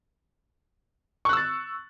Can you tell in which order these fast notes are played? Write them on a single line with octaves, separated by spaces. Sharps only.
C#6 F#6 E6 A6